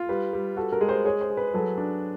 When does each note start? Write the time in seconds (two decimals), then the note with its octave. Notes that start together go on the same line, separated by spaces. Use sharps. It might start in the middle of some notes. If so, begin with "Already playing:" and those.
Already playing: F4
0.09 G3 B4
0.33 G3
0.56 F#4 A4
0.72 A#4
0.81 G#3
0.89 C5
1.05 G#4 C#5
1.21 C5
1.30 G#4
1.37 B4
1.54 F#3 A4
1.78 D4